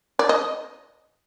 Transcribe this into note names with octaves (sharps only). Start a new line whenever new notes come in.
D5
D#5